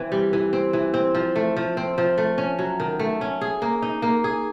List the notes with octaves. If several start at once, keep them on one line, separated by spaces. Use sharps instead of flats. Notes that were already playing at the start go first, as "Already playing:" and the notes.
Already playing: E3 C4
G3
E3
C4
E3
C4
F3
A3
F3
C4
F3
A3
C#4
F#3
D#3
A3
C#4
G#4
A#3
D#4
A#3
G#4